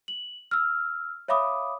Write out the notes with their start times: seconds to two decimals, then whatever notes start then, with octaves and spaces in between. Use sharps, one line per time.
0.08 F#7
0.51 E6 F6
1.28 C#5 E5 F5 B5 D6 D#6